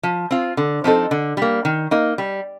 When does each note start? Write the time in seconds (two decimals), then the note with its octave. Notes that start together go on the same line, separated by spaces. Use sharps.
0.03 F3
0.31 C4 F4
0.57 D3
0.84 F3 C4 D#4 A4
1.11 D3
1.37 G3 A#3
1.65 D#3
1.91 A#3 D#4
2.18 G3